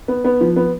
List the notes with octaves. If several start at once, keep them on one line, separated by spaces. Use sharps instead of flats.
B3
B3
F3
B3